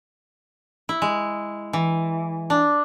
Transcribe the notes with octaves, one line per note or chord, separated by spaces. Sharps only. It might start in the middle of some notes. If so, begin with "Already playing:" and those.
E4
G#3
E3
D4